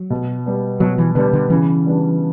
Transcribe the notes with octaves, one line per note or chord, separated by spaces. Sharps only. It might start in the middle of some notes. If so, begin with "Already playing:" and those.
Already playing: F#3
B2
G3 B3
B2 F#3
E3
D3 G3 B3
D3
C#3 E3
G3 B3 D4